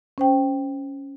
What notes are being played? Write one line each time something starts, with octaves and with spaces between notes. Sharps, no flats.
C#4 C5 G5